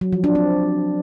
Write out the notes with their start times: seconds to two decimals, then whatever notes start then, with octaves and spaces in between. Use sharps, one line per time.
0.01 F#3
0.13 F3
0.24 D4
0.35 C4